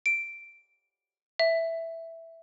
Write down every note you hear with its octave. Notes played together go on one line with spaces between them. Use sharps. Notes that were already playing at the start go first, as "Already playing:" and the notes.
D7
E5